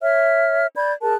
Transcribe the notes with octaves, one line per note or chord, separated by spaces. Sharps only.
C#5 E5 F6
D5 B5 G6 G#6
G#4 A#4 A5 F#6